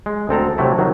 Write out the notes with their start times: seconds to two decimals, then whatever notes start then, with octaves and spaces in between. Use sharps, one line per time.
0.06 G#3
0.29 D2 C4 A4 A#5
0.58 C3 F#3 A3 E4
0.78 D#3 F#3